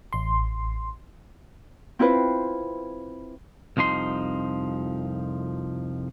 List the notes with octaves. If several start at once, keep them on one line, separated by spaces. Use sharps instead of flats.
A1 C6
C4 E4 F4 B4 C5
C2 F2 F3 D#4 C6